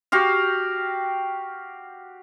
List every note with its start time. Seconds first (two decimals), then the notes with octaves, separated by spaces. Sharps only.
0.12 F#4 G4 F5